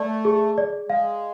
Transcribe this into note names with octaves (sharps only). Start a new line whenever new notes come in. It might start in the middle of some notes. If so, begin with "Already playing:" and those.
Already playing: A3 D5
G#4
D5
G#3 F5